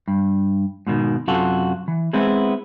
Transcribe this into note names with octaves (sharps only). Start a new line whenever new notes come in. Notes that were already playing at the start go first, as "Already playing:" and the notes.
G2
G#2 B2 D#3
F#2 C3 F4 F#4 A4
E3
G#3 B3 C4 E4 G#4